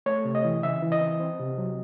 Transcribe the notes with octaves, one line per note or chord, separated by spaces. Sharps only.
A3 C#5
C3
D#5
E3
C#3 E5
E3
D#5
C4
C4
C3
F#3